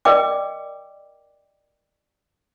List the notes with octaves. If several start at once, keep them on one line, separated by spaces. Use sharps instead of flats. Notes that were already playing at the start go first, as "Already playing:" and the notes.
A#4 D5 D#5 G5 D6